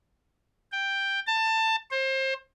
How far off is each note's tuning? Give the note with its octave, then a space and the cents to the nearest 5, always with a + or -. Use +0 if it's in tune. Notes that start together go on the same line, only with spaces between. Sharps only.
G5 +5
A5 +20
C5 +30